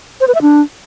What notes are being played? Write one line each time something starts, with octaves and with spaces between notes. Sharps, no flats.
C5
B4
E5
D4